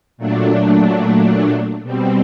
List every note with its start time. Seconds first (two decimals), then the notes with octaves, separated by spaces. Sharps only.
0.18 A#2 F#3 A3 D4
1.83 B2 G3 C4